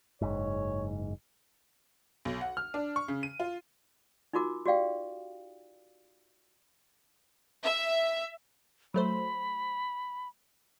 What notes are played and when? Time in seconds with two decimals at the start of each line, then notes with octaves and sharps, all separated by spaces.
0.22 F#1 G#2 C#5
2.25 B1
2.41 F#5
2.57 F6
2.74 D4
2.96 C#6
3.08 C#3
3.23 D#7
3.40 F4
4.33 D#4 F4 F#4 A#4 D6
4.65 F#4 G4 D5 F5 G5
7.63 E5
8.94 F#3 A3 C5 B5